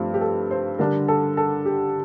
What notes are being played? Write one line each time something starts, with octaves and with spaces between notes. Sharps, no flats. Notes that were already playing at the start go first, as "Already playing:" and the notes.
Already playing: G2 F3 A3 C4 G4
G4
A4
C5
D3 G3 D4 A#4
A4
A4
G4